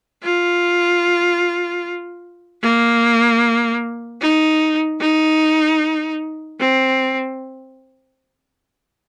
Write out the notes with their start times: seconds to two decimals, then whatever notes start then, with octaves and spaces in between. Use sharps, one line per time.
0.23 F4
2.62 A#3
4.21 D#4
5.00 D#4
6.60 C4